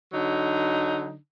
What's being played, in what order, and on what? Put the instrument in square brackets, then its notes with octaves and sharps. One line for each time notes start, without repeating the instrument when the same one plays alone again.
[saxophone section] D3 F#3 D#4